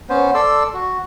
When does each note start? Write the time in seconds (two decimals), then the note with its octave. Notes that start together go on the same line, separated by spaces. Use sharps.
0.09 B3 C#4 C5
0.34 A4 D5 C6 E6
0.74 F#4